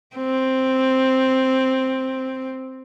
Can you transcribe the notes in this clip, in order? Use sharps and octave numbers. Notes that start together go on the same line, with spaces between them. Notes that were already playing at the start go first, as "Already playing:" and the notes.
C4